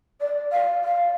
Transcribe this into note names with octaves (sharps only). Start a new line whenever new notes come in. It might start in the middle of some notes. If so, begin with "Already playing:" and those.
D5
F5
F5